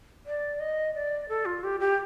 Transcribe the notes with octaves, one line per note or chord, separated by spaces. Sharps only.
D5
D#5
D5
A4
F4
G4
G4